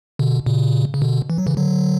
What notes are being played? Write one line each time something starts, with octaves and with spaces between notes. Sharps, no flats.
B2 D3
A#2 C#3
C#3
B2 D3
E3
F#3
C#3 E3
D3 F#3